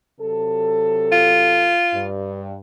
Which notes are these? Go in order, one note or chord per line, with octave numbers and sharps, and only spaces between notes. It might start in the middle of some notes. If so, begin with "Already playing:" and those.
C3 F#3 A4
F4
G2